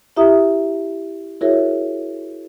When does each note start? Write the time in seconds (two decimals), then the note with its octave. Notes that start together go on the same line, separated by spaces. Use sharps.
0.16 E4 G4 E5 A#5 D#6
1.41 E4 F#4 G#4 A#4 C#5 E5